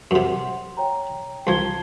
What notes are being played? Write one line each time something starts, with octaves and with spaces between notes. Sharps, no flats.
F#2 C3 F#5 C6
C#5 G5 A#5
C2 F3 A5 G#6 G7